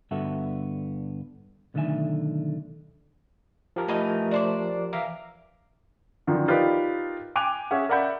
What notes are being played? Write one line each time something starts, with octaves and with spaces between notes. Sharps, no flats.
G2 D3 B3 F#4 A4 E5
B1 D3 D#3 A3 E5 G#5
F3 G4 A#4
E3 A3 D#4 D#5
D4 C5 D5
E3 A#4 E5 F5 D6
F#2 D3 D#3 F3
D#4 F4 G4 A#4 B4 D5
G5 G#5 D6 F#6 D#7 F7
C#4 G#4 E5 F#5
A#4 D5 E5 F#5 B5 G6